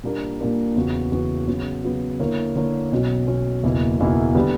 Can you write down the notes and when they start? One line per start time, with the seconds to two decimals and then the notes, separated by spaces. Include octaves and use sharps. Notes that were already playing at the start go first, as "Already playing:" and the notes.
0.04 A#2 G3 A#3 D4 A#4
0.40 A#2 G3 A#3 D4 A#4
0.76 E2 C#3 E3 B3 F#4
1.12 E2 C#3 E3 B3 F#4
1.48 C#3 F#3 B3
1.83 C#3 F#3 B3
2.20 D3 A#3 E4 A#4 C#5
2.55 D3 A#3 E4 A#4 C#5
2.91 B1 B2 F#3 C#4
3.27 B1 B2 F#3 C#4
3.63 F#1 E2 B2 A#3 E4
3.99 F#1 E2 B2 A#3 E4
4.35 D3 G3 B3